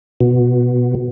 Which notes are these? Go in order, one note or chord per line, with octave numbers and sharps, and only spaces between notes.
B2